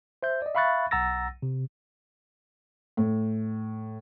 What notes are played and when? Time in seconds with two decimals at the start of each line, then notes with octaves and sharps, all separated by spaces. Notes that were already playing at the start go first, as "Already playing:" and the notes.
0.23 C5 E5 G6
0.42 D5 D#5
0.55 E5 F5 B5 C#6 F#6 A6
0.91 B1 F#5 A#5 E6 A6 A#6
1.42 C3
2.97 A2